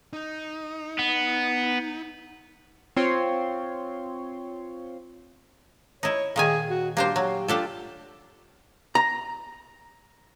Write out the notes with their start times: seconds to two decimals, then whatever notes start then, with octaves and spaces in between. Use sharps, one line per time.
0.13 D#4
0.99 B3
2.97 C4 F4 C#5 C6
6.03 D#4 E4 C#5
6.36 A#2 D#3 G#4 G#5
6.70 F#4
6.97 G3 A#3 D4 C5
7.16 F#3 G4
7.48 D4 F4 G4 A4
8.95 A#5